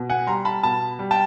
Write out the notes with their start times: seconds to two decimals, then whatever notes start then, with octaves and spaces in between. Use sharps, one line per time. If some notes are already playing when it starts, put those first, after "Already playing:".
Already playing: B2
0.10 F#5 G#5
0.27 G3 A#5 C6
0.45 A5 B5
0.63 B2 A5 B5
0.99 G3
1.11 G5 A5